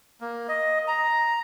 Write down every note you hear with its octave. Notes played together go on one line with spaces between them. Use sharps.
A#3
D#5
A#5